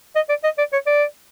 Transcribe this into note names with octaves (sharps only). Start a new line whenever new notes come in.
D#5
D5
D#5
D5
C#5
D5